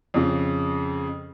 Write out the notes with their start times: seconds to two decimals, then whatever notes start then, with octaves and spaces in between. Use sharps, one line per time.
0.14 F2 C#3